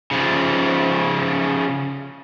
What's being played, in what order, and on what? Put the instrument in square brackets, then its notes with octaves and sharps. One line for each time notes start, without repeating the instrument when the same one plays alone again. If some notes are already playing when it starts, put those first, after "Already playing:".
[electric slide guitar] C#3 F3